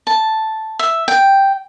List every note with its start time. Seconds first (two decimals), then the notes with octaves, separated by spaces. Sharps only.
0.07 A5
0.79 E5
1.08 G5